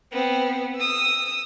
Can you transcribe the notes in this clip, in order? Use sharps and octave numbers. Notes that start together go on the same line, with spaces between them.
B3 C4
D#6 E6